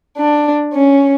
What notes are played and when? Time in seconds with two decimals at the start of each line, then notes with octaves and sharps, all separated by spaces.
0.18 D4
0.74 C#4